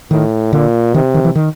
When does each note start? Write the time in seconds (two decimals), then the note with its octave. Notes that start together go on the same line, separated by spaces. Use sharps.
0.11 A2 D#3
0.53 A#2 D3
0.94 C3 D#3
1.14 D#3
1.25 E3
1.35 D#3